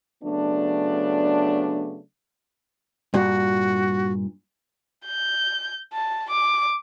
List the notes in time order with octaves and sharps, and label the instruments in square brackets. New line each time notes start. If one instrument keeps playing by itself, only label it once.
[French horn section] C#3 F#3 A3 B3 D4
[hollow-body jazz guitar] G2 A#2 [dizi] F#4
[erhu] G6
A5
D6